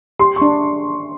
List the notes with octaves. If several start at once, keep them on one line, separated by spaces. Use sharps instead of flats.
G4 C6
C#6
D4